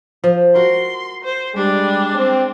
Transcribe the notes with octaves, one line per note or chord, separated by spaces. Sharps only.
F3
F#4 A#4 C6
C5
G3 G#3 D4
C4